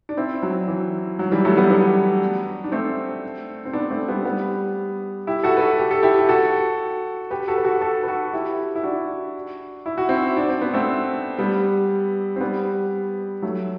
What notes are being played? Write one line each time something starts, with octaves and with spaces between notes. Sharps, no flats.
D4
C4 E4
F#3
E3
F#3
E3 G3
F#3 A3
G3 B3
B3 D4
D4
A3 C4
C4
B3 D4
A3 C4
G3 B3
G3 B3
E4 G4
F#4 A4
B4
F#4 A4
G4
A4
E4 G4
G4
F#4 A4
G4 B4
F#4 A4
B4
F#4 A4
F#4 A4
B4
F#4 A4
E4 G4
E4
D4 F#4
E4
F#4
C4 E4
D4
C4
B3
A3 C4
G3 B3
C4
G3 B3
F#3 A3